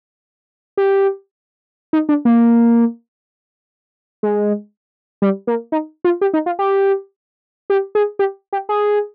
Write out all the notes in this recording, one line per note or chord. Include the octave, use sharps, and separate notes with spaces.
G4
D#4
D4
A#3
G#3
G3
A#3
D#4
F4
G4
D#4
F4
G4
G4
G#4
G4
G4
G#4